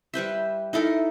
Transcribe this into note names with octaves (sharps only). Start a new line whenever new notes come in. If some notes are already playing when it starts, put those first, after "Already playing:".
G3 B4 C5 E5
D#4 E4 A4 A#4